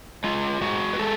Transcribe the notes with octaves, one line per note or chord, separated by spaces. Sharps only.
G#3 F4
G#3 F#4
B4
G#3 A4